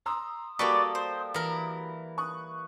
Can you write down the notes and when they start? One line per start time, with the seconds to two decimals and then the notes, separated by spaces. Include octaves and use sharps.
0.06 A#5 C6 D#6 E6
0.59 G3 A#3 F#4 G4 A4 B4 D5 C#6
0.95 C5
1.34 E3 E4 A#4
2.18 C#6 D#6 F#6